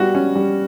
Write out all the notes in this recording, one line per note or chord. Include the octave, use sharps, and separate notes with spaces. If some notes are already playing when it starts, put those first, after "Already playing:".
Already playing: G3 B3 F#4
C#4
G3